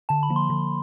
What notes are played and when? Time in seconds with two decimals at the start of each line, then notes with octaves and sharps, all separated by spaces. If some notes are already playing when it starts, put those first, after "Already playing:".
0.09 D3 A5
0.23 B5
0.30 F3 A#3
0.36 C6
0.50 D3